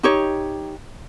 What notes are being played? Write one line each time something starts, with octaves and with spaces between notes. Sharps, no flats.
D#4 G4 C#5